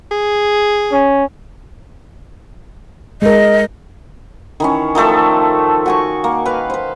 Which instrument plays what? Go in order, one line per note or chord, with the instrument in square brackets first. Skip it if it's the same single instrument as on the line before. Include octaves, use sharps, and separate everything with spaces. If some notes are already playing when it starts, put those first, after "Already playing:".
[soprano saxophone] G#4
[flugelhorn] C#4
[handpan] G#3 A#4 [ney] D#5
[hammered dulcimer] D#3 E3 C#4
D#3 F3 A3 A4
F#4 G#5 C#6
A#3
B4 F5
B4 C5